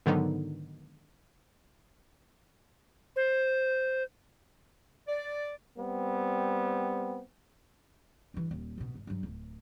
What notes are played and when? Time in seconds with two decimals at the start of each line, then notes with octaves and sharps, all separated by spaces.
0.06 G#2 D3 D#3 F#3 B3 D#4
3.16 C5
5.07 D5
5.78 G3 B3 C4
8.34 G2 E3
8.51 D#1
8.78 A1 B2
8.94 F2 G#2
9.07 G2 F#3
9.23 D1 C2